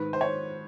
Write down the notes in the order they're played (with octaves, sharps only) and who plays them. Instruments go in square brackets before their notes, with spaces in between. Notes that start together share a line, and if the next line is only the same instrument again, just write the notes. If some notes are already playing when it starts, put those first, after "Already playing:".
Already playing: [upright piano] G#2 D#3 B4
C5
C#5